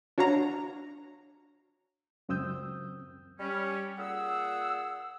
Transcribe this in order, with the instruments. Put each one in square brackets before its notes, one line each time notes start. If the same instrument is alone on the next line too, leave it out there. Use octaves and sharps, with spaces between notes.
[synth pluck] D4 F#4 C#5 F5 A#5
[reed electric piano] C#2 F#2 C4 D#6 E6 G6
[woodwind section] G3 C#4
A#2 G#4 F#5 E6